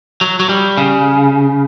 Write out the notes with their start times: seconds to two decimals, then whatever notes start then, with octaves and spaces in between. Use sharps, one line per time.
0.21 F#3
0.40 F#3
0.49 G3
0.77 C#3